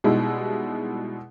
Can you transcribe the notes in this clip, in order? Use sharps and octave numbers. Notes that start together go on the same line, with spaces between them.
B2 G3 G#3 D#4 E4